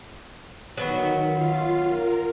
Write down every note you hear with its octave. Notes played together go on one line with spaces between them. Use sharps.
D#3 F#3 B3 F#4
F4 F5
A#4